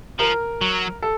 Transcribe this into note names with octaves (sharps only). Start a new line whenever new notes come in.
F3 A#4
F#3
A4